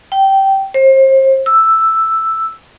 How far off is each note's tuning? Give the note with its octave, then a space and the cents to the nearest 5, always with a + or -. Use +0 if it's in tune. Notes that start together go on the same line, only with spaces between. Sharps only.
G5 -15
C5 +35
E6 +0